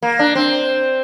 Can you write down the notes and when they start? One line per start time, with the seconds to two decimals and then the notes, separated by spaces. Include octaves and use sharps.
0.02 A#3
0.19 D4
0.35 C4